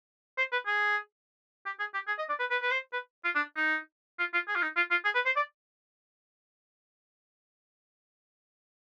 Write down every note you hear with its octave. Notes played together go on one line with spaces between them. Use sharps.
C5
B4
G#4
G4
G#4
G4
G#4
D#5
D5
B4
B4
B4
C5
B4
F4
D4
D#4
F4
F4
G#4
F4
D#4
F4
F4
G#4
B4
C5
D5